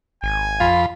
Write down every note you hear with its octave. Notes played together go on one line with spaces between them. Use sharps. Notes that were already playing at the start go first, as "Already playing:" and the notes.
G#1 G#5
F2 F4 B5